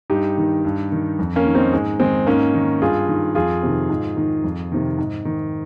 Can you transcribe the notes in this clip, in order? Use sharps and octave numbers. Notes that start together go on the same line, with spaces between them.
G2 D#4 G4
D#3
G2
D#3
F2
A#3 C#4
D#3
C4 D#4
G#2 G#3
D#3 G#3 C4
G#2 A#3 C#4
D#3
G2 F4 G#4
D#3
F2 F4 G#4
C3 D#3
G#2
D#3
F2
C3 D#3
G#2
D#3